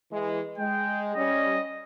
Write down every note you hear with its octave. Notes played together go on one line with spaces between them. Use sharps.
E3 G#3
G#3 G5
G3 C#4 D#5